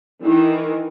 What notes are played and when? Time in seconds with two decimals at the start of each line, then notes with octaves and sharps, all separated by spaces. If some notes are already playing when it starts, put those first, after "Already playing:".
0.22 D#3 E3